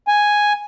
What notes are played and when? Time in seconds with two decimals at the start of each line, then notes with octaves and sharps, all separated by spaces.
0.08 G#5